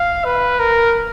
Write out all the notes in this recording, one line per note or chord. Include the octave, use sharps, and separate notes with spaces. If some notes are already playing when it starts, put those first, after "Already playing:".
Already playing: F5
B4
A#4